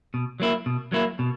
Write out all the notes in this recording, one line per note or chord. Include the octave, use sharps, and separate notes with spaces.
B2
F#3 A#3 E4
B2
F#3 A#3 E4
B2